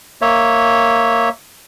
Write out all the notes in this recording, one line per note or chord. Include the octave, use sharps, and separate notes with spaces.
A#3 C#5 E5